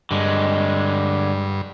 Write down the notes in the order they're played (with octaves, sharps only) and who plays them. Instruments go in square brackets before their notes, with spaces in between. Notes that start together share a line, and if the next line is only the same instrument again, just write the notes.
[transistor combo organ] G2 [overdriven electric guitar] D3 G#3